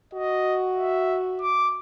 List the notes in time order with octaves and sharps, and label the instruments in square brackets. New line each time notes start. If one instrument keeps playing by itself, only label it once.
[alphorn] F#4 [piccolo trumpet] D#5
[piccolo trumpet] E5
D6